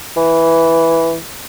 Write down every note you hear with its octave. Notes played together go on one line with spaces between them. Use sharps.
E3